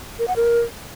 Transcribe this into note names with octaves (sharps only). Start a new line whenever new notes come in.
A#4
F#5
A#4